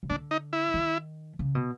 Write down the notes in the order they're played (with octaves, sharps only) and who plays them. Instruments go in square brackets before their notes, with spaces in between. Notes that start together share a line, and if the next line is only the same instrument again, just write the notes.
[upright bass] C#3
[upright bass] D3 [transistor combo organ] D4
[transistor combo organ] D#4
E4
[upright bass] D#3
C#3
B2